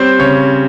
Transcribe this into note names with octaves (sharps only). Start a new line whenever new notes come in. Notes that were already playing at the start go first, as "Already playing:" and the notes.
Already playing: G3 C4 C5 C#5
C#3 C#5